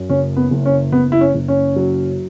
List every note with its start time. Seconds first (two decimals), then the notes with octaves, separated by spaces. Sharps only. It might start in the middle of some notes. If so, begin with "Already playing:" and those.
Already playing: F#2
0.09 F#1 C#4
0.37 B3
0.51 F#1
0.65 C#4
0.92 F#1 B3
1.12 E4
1.21 C#4
1.34 F#1
1.48 C#4
1.76 F#3